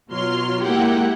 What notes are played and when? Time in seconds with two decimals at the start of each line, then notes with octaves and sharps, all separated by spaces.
0.10 B2 F#3 F4 C6 F6
0.62 G#3 A#3 E4 G4 F#5 G5